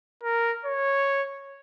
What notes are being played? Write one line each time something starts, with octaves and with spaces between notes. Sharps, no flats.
A#4
C#5